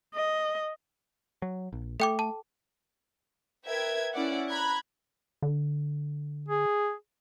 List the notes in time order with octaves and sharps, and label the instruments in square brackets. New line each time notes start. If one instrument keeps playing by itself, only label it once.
[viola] D#5
[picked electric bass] F#3
A#1
[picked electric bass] A3 [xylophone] A4 G5 D6
[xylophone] A5
[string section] A#4 B4 E5 G5 G#6
C#4 E4 D5 F#5
A#5 B5 F#6 G#6
[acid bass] D3
[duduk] G#4